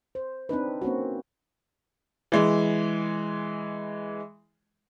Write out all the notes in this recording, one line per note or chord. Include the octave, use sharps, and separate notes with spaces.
C5
C4 D4 D#4 B4
A#3 C4 C#4 F#4
E3 G#3